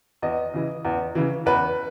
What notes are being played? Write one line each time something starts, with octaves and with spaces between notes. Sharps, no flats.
E2 D#5
C#3 E3
E2
C#3 E3
E2 B4